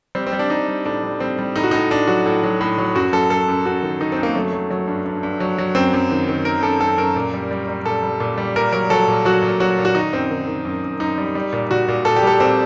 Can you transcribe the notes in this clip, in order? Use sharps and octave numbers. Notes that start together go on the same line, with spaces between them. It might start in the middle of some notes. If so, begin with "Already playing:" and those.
G3 C4
C4
G3
D4
G3 D#4
G3
A2 D4
G3
G3 C4
G3
A2 D#4
F#4
A2 D#4
A2 D4
F#3 F#4
A2
F#3
A2
F#3
F#2 F#4
F#2 A4
F#2 A4
F#2
F#2 F#4
D#3
D#3 D#4
C4
F#2
A#3
F#3 A3
F#3
F#3
G2
G2
G2
F#3
F#3
F#2 C4
F#2
D#3
D#3
D#3 A#4
F#2 A4
F#2 A4
F#2 A#4
A#2
G3
G3
G3
A#2 A4
G3
A#2
G3
A#2 A#4
F#3 A#4
F#3 A4
A#2
F#3 F#4
A#2
F#3 F#4
A#2
F#4
D#3 D#4
F#2 C4
D#3
D#3
F#2
F#2
F#2 D#4
G3
G3
A#2
A#2 F#4
A#2
A#2 A4
G4
G3 A4
A#2 C4